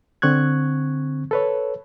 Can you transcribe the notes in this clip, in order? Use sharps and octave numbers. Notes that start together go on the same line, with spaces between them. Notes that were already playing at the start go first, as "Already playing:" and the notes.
D3 C4 C#6 F#6 G#6
A4 B4 C#5